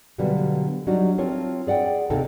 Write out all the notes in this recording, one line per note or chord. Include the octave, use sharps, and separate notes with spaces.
B2 D3 F#3 G3 A#3 B3
F#3 G3 D4 D#4 F#4
C4 F4 A#4 C#5 A5
G#4 D5 F#5 G5
D#2 C3 A#3 D#4 A4 G5